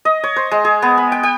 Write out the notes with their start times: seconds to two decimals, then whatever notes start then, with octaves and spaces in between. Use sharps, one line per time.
0.05 D#5
0.24 C#5
0.36 C5
0.51 G#3
0.65 G#4
0.82 B3
0.98 B5
1.12 G5
1.23 G5